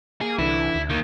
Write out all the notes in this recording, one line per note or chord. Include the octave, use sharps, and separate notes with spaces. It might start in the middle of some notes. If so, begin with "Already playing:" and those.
A#3 G#4
C2 D3 E3 E4
D2
D#3 A#3